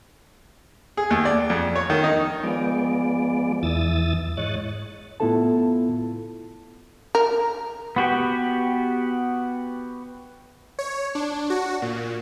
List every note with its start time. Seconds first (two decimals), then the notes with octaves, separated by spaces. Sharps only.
0.97 G#4
1.11 D#2
1.25 D5
1.50 F2
1.75 C#5
1.90 D#3
2.04 D#4
2.43 F3 G#3 B3 D5
3.63 E2 E3 D#6 E6 A6
4.37 G#2 C#5 D#5 F#6 A6
5.20 A2 B3 E4 F4 A4 A5
7.15 A#4
7.96 B3 F#4 G4
10.79 C#5
11.15 D4
11.50 F#4
11.82 A#2